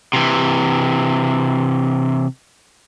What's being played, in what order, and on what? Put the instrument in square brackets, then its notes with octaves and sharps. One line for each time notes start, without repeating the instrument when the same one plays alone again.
[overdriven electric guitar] C3 E3